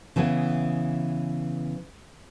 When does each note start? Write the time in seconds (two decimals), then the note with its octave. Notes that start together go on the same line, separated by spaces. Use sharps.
0.16 C#3 E3 B3 G#4